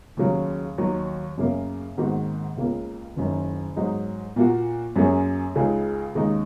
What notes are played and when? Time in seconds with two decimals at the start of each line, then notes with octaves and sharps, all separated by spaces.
0.17 D#2 C#3 F#3
0.78 D#2 D#3 F#3
1.37 F#2 C#3 A#3
1.97 G#1 G#2 D#3 A#3 F#4
2.57 C#2 C#3 A#3
3.16 F#1 F#2 D#3
3.76 G#2 F#3 D#4
4.36 A#2 A#3 F#4
4.96 F#2 F#3 A#3 C#4 G#4
5.55 C#2 C#3 G#3 D#4 G#4
6.15 D#2 C#3 G#3 D#4